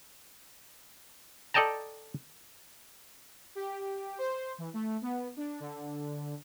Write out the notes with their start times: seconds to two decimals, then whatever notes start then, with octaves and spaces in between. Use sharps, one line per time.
1.54 A4 D5 D#5 G5 A5 A#5
3.55 G4
4.18 C5
4.58 E3
4.74 A3
5.02 B3
5.37 D4
5.60 D3